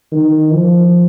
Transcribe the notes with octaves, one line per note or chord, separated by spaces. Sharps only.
D#3
F3